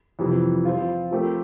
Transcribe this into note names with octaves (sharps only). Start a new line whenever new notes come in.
F2 C3 E3 G3
F3 C4 F4
F3 A3 C4 G4 A#4